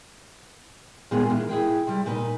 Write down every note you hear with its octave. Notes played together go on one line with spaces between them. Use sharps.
A#2 D#3 G#3 B3 F4 G#4
E3 A#3
E4 G#4 G5
C3 G3
A#2 D#4 B4